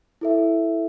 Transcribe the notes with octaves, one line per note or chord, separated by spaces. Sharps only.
E4 A4 E5